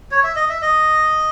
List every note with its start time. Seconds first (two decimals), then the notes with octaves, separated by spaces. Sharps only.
0.11 C#5
0.24 E5
0.36 D#5
0.49 E5
0.62 D#5